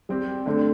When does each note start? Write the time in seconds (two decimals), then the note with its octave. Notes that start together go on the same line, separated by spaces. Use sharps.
0.09 G3 C4 G4
0.46 D3 A3 C4